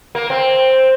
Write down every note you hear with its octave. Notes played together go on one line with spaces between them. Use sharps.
A#3
C4